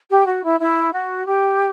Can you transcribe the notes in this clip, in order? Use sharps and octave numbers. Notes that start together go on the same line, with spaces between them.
G4
F#4
E4
E4
F#4
G4